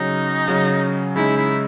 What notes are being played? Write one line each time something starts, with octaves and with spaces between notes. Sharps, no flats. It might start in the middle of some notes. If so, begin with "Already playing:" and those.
Already playing: C#3 F#3 C#4 D#4
C#3 F#3 C#4
C#3 G#3 D#4 E4
E4